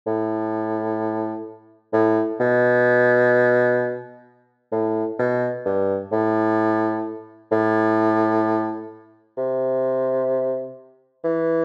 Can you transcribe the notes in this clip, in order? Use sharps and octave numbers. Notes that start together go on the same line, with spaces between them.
A2
A2
B2
A2
B2
G2
A2
A2
C3
E3